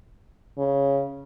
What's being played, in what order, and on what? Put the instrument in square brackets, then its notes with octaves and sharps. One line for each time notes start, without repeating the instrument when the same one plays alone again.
[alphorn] C#3